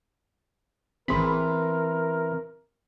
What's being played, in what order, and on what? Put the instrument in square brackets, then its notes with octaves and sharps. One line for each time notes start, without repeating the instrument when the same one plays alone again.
[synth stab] A1 G#4 B5 [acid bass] E3 [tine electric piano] C4 C6 [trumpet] A#4